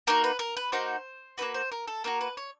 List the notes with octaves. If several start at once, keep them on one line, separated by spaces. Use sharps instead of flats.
A#3 D#4 F#4 A#4
B4
A#4
B4
A#3 D#4 F#4 C5
A#3 D#4 F#4 B4
C5
A#4
A4
A#3 D#4 F#4 A#4
B4
C#5